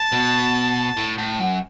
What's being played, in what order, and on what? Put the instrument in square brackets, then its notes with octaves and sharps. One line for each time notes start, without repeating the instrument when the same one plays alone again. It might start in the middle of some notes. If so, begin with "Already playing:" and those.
Already playing: [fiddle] A5
[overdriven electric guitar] B2
A2
A2
F#2